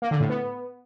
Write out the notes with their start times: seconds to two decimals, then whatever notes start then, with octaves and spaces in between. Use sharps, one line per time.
0.02 A#3
0.11 D3
0.20 A2
0.29 B3